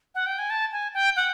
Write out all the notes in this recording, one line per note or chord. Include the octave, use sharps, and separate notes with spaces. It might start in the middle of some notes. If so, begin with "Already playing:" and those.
F#5
G5
G#5
A5
G#5
G5
F#5